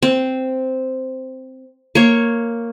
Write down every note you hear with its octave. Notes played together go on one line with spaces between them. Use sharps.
C4
A#3 C#5